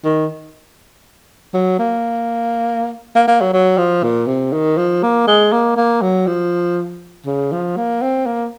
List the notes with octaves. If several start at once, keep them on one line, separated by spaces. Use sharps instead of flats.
D#3
F#3
A#3
A#3
A#3
F#3
F#3
F3
A#2
C3
D#3
F3
A#3
G#3
A#3
A#3
F#3
F3
C#3
F3
A#3
C4
A#3